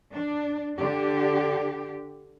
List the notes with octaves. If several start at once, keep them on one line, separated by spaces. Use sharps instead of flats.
D4
D3 D4 G4